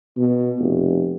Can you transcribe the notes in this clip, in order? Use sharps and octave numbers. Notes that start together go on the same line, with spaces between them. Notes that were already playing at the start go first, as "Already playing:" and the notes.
B2
F1